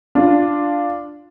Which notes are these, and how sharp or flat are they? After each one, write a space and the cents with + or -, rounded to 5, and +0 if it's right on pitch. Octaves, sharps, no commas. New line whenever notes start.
D4 +0 F4 -5